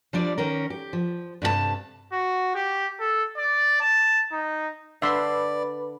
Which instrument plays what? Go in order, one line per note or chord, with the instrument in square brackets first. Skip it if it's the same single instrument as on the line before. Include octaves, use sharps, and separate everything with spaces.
[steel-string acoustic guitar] F3 G3 D4 D5
D#3 C#4 A#4
G4
F3
G2 C3 G#4 A5
[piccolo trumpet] F#4
G4
A4
D5
A5
D#4
[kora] D3 D4 [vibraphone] B4 B5 [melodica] D5 [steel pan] E5 C6